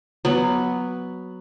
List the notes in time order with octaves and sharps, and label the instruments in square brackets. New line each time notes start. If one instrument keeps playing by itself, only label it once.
[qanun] F#3 B3